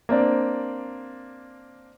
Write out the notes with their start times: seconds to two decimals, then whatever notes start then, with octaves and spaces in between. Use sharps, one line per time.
0.09 A#3 C4 D4 D5